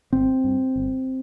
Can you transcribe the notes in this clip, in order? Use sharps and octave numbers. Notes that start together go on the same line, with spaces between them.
G1 C4
G2
G1